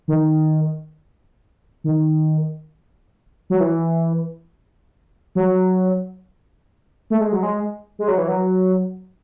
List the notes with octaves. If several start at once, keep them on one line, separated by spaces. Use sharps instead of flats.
D#3
D#3
F#3
E3
F#3
A3
G#3
F#3
G#3
G#3
F#3
E3
F#3